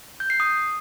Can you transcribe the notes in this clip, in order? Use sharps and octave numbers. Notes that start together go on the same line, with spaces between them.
G6
C7
D#6